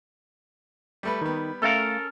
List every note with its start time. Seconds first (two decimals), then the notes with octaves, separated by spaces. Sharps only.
1.03 G3 A3 B4
1.21 D#3 G3 B3
1.62 A3 C#4 A4 A#4 F5